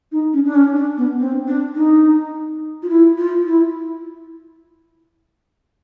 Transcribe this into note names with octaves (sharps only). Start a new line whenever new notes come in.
D#4
C#4
D4
C#4
D4
B3
C4
D4
D#4
F4
E4
F4
E4